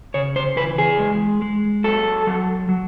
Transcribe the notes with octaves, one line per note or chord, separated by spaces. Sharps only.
C#3 C#5
C5
E3 B4
G#4
G#3
G#3
F#3 A4
F#3
F#3